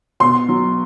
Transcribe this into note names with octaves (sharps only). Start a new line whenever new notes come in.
B2 C6
F#3